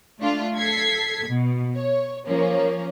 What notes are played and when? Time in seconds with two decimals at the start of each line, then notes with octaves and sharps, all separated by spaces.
0.21 A3 D4 F4
0.57 A4 G#6 B6 C7
1.29 B2
1.76 C#5
2.27 F3 A#3 C#4